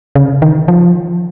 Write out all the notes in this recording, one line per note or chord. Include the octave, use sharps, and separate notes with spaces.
C#3
D#3
F3